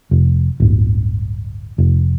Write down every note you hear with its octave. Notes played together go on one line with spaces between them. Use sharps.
F1
D1 G1
F1